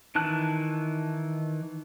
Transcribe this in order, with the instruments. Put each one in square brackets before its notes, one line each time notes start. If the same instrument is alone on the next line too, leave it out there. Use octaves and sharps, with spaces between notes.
[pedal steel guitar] D#3 E3 A5 F#6